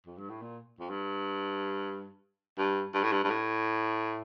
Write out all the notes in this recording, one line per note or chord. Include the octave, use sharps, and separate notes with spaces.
F2
G2
A2
A#2
F2
G2
G2
G2
A2
G2
G2
A2